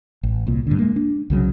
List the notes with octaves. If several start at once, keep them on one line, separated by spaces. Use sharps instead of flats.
A1
C2 A#2
G2 D3
G#3 A#3
D4
C2 C#3 E3 F#3